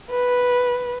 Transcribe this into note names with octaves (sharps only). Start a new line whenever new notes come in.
B4